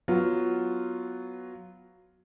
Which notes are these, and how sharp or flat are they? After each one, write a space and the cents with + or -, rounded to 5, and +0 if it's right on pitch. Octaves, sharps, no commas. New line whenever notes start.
F#3 +0 B3 +0 F4 +0